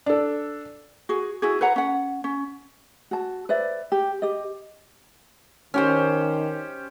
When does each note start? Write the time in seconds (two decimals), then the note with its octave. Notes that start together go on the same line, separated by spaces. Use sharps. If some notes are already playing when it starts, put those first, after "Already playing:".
0.06 D4 A4
1.09 F#4 G#4
1.42 E4 F#4 G#4
1.61 B4 C#5 F#5 A#5
1.76 C#4 F#5
2.24 C#4
3.11 F#4 A5
3.49 B4 C5 D5 E5
3.92 G4
4.22 G4 D#5
5.74 D#3 C#4 G4 C5